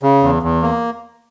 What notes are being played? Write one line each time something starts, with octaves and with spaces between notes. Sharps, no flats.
C#3
E2
E2
A#3